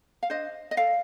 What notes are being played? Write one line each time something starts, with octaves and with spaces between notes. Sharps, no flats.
F5
D4 C5 D#5
D#5
A4 D5 F5